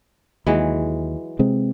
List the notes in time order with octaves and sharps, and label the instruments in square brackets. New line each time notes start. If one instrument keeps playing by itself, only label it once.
[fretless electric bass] D#2 [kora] E3 F#3 G#3
[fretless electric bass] C3 G#3 C4